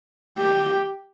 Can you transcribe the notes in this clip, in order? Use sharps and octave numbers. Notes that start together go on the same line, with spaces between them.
G4